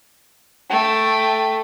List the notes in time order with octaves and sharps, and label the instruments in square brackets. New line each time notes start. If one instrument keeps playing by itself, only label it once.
[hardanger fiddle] A3 [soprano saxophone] G5